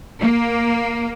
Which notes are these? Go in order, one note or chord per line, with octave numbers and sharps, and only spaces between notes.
A#3